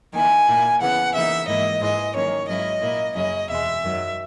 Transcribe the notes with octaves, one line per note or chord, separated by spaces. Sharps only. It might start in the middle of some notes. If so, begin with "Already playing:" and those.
D#3 A#3 E4 G#5
A#2 A#3 E4
C#3 E3 B3 F#5
C#3 E3 A#3 D#4 E5
G#2 E3 A#3 E4 D#5
G#2 E3 G#3 D#5
D#3 F#3 A#3 C#4 C#5
G#2 F#3 C#4 E4 D#5
A#2 A#3 E4
F#2 C#3 F#3 C#4 E4 D#5
E2 B2 G#3 E5
F#2 D#3 F#3